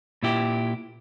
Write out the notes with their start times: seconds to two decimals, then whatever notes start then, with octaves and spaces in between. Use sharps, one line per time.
0.23 A#2 E4 G4